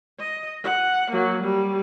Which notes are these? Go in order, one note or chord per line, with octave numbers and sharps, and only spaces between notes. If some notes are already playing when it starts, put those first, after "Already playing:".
D#5
F#5
F#3 A#3
G3